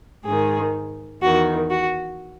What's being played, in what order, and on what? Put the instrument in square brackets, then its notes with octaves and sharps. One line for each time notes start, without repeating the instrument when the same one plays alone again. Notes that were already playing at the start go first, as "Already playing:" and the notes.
[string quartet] G#2 D#3 G#4
E2 D#3 F#4
F#4